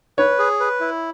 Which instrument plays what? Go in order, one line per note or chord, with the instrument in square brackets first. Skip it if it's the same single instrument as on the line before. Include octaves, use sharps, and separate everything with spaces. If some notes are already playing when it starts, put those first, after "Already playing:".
[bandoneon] B4 [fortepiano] C#5
[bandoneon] G#4
B4
E4